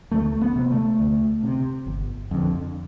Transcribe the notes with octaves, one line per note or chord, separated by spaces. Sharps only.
D2 A3
B3
C3
A3
D2
C3
G1
F2 D3